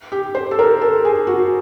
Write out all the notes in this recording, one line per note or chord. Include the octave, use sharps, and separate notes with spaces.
G4
C5
A4
A#4
A4
G#4
F#4